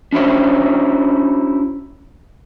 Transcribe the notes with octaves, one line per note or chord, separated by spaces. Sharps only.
C#4 D4 E4 F#4 C5 C#5